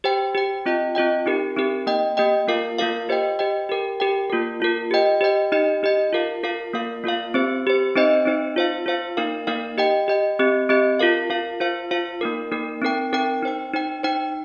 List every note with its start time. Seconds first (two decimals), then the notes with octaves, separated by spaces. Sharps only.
0.04 G4 C5 G5
0.35 G4 C5 G5
0.66 C4 F4 D#5 G5
0.95 C4 F4 D#5 G5
1.26 C4 D#4 G4 A#4
1.56 C4 D#4 G4 A#4
1.87 A#3 G4 D#5 G5
2.17 A#3 G4 D#5 G5
2.48 A#3 F4 A#4 F5
2.78 A#3 F4 A#4 F5
3.09 G4 C5 D#5 G5
3.39 G4 C5 D#5 G5
3.69 G4 A#4 G5
4.00 G4 A#4 G5
4.30 A#3 F4 A#4
4.60 A#3 F4 A#4
4.91 G4 C5 D#5 G5
5.21 G4 C5 D#5 G5
5.52 D#4 G4 D#5
5.83 D#4 G4 D#5
6.13 F4 A#4 F5
6.43 F4 A#4 F5
6.74 A#3 F4 A#4 F5
7.04 A#3 F4 A#4 F5
7.34 C4 G4 C5
7.65 C4 G4 C5
7.96 C4 D#4 C5 D#5
8.26 C4 D#4 C5 D#5
8.56 F4 C5 F5
8.86 F4 C5 F5
9.17 A#3 D#4 A#4 F5
9.47 A#3 D#4 A#4 F5
9.78 G4 D#5 G5
10.08 G4 D#5 G5
10.39 C4 G4 D#5
10.69 C4 G4 D#5
10.99 F4 A#4 F5
11.30 F4 A#4 F5
11.60 F4 C5 F5
11.91 F4 C5 F5
12.21 A#3 D#4 A#4
12.52 A#3 D#4 A#4
12.81 C4 D#4 A#4 G5
13.13 C4 D#4 A#4 G5
13.43 D#4 C5 G5
13.73 D#4 C5 G5
14.03 D#4 C5 G5